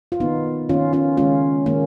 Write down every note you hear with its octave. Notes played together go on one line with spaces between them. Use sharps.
F4
D#3 A#3 B3 D#4
D#3 A#3 C#4 F4
C#4 F4
D#3 G#3 C#4 F4
D#3 G#3 A#3 C#4